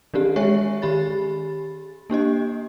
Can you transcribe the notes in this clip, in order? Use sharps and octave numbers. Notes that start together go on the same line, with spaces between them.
D#3 E3 C4 G4
G#3 C#5 E5 G#5 C#6
D#3 G4 B5 A6
A#3 D4 G4 D#5